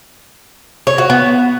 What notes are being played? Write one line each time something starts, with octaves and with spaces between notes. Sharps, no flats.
C#5
F#4
B3